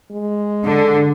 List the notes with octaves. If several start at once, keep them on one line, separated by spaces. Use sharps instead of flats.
G#3
D3